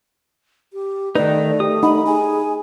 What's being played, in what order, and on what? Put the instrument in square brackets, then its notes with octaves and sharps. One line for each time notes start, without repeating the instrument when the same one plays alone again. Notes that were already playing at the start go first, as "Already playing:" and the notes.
[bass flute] G4
[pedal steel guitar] D#3 D#4 [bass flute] A3 [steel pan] B4 [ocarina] D5
[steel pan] G4 [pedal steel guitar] D#6
[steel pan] D#4 [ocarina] B5
[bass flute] G#4 [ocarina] G#5